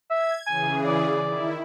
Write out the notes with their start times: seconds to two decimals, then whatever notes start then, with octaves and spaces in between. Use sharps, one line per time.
0.10 E5 G#6
0.47 C#3 E3 G#4 G#5
0.85 D5
1.25 D#3 E4